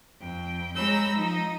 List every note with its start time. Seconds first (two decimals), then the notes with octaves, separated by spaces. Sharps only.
0.21 F2 G5
0.75 G#3 C#5 A#5 B5 E6 G6
1.15 F3 D#4